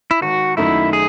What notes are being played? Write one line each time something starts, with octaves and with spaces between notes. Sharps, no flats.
E4
G#1 F#4
F#2 D#3 A3 D#4 E4
G#4